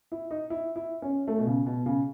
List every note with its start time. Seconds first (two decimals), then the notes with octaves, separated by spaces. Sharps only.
0.12 E4
0.31 D#4
0.50 E4
0.76 E4
1.02 C#4
1.28 A3
1.38 B2
1.47 C#3
1.66 B2
1.86 C#3